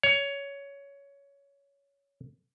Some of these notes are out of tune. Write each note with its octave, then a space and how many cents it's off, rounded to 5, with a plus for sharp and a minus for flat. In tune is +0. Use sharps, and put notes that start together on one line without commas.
C#5 +15